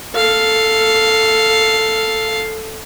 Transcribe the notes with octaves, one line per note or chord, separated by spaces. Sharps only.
A4 F5